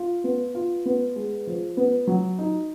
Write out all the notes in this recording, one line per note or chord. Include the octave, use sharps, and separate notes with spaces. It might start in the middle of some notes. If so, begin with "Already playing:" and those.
Already playing: F4
B3
F4
B3
G#3
F3
B3
F#3
D#4